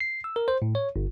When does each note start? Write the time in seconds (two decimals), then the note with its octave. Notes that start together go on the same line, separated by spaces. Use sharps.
0.01 C7
0.24 E6
0.36 A#4
0.48 C5
0.62 A2
0.75 C#5
0.96 G1